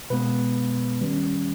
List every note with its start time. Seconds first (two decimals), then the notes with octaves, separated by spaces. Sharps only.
0.10 B2 G#3 B3 B4
1.00 D#3 G3 C#4